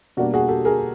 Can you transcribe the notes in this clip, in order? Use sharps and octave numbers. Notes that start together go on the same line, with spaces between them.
B2 G3 A#3 D4 F#4
F#4 G#4
G4 A4
G#4 A#4